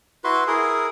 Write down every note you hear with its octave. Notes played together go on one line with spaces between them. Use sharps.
E4 F#4 B4 C6
E4 G#4 A#4